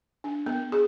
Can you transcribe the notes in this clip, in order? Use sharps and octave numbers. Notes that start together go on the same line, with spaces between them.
D4
B3
G#4